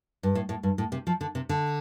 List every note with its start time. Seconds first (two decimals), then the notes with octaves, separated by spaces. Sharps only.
0.23 G2
0.35 A2
0.49 A2
0.63 G2
0.78 A2
0.92 C3
1.07 F3
1.21 D3
1.35 C3
1.49 D3